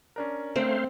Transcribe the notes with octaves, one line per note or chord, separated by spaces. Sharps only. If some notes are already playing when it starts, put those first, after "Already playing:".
C#4 D4 A#4
A3 C4 C5 F5